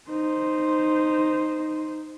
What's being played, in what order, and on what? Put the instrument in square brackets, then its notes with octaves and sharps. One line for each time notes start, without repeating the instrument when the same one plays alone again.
[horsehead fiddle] D#4 C5